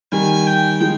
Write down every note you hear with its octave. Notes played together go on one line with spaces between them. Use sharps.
D#3 G3 G#5
G5
F3 G#3